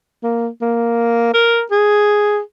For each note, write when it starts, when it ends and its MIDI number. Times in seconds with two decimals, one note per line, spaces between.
0.23 0.49 58
0.62 1.31 58
1.34 1.63 70
1.71 2.40 68